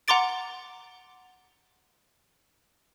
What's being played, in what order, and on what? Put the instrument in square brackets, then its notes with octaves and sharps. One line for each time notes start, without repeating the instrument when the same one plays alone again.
[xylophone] F#5 A#5 C6 D6 A6 D7